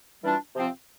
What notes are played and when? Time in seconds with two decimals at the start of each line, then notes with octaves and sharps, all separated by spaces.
0.23 E3 G3 D4 F4
0.55 C3 F3 C4 F4